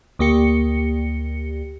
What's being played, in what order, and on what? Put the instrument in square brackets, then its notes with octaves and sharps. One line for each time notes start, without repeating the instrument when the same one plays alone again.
[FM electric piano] D2 A#3 G4 C#7